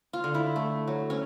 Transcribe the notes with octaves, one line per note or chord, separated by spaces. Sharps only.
F4
D3
E4
A3
F#3
C#4